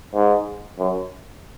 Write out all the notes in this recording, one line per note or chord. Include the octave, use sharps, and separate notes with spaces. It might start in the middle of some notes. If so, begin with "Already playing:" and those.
G#2
F#2